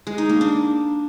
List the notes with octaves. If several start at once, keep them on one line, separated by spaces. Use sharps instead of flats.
G#3
D#4
A#3
D4